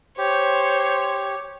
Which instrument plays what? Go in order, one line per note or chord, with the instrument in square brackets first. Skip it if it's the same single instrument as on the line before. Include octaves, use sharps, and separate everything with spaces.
[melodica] G4 [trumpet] C5 [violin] C#5